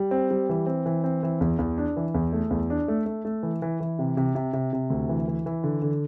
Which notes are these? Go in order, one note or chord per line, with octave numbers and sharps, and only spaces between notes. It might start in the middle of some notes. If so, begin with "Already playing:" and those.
Already playing: G3
C4
G3
E3
C4
E3
C4
E3
E2
E2
D4
E3
E2
A3
E2
D4
A3
A3
A3
E3
E3
E3
C3
C3
C3
C3
C3
D2
E3
E3
E3
D3
D3